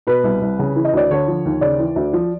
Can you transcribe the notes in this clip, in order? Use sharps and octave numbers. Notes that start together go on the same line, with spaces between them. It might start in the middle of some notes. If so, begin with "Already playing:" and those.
B2 B4
C2
C2
C#3
E3
D#5
D2 D5
D3 C#5
F3
D#2
C#3 D5
E3
D2
F3